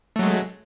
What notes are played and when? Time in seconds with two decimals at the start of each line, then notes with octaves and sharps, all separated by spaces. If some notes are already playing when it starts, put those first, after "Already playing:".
0.16 A3
0.19 F#3
0.23 G#3